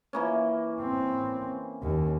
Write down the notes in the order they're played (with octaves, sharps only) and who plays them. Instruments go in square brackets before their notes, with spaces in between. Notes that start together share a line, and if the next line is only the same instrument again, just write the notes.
[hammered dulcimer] E3 A#3 C#4
[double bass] C4
D#2